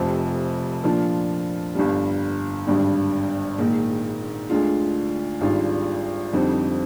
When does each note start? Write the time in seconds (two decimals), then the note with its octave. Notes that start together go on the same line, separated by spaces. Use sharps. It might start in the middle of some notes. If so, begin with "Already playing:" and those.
Already playing: F1 F2 C3 F3 C4
0.84 A#2 F3 A#3 D4 F4
1.75 G1 G2 D3 G3
2.67 G#1 G2 D3 G3 D4
3.58 A#1 G#2 D#3 A#3 D#4
4.50 D2 D3 G#3 D4 F4
5.41 G#1 G#2 G3 D4 F4
6.33 F2 D3 G3 C4 D#4